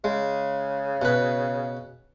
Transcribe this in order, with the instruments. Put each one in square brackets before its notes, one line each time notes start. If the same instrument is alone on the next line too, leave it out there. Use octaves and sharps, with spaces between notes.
[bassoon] C#3 [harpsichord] G#3
[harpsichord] B2 B4